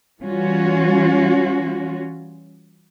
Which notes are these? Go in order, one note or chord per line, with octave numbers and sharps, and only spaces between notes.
E3 G3 C#4 F4 F#4